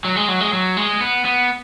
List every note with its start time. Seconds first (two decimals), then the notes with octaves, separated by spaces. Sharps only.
0.05 F#3
0.16 G#3
0.28 F#3
0.40 G#3
0.53 F#3
0.77 G#3
1.01 B3
1.25 B3